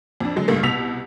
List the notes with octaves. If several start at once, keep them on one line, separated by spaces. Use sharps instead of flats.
F2 D4
D3 F#3 G#3
C#2 G2 G3 A3 A#3
C2 B2 E6 B6 F7